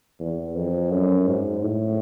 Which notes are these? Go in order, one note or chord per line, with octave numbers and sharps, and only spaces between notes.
E2
F2
F#2
G#2
A2